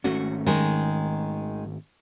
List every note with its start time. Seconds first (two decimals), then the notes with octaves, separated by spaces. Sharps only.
0.04 G#1 A3 C#4 F#4
0.46 D#3 G#3 A#4